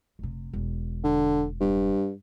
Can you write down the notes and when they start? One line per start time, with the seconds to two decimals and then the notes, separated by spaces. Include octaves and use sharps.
0.19 F1 C3
0.53 E1
1.04 D3
1.61 G2